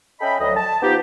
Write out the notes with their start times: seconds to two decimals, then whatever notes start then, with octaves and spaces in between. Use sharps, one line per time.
0.20 C#4 A4 D#5 E5 G5 B5
0.40 D2 F#3 D#5
0.56 A5
0.82 F3 B3 D#4 F4 G4